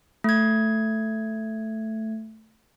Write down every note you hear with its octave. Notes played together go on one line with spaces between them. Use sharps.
A3 G#6